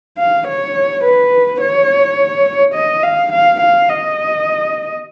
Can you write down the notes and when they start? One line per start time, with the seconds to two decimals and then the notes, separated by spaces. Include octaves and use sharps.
0.17 F5
0.47 C#5
1.04 B4
1.61 C#5
2.74 D#5
3.03 F5
3.32 F5
3.60 F5
3.89 D#5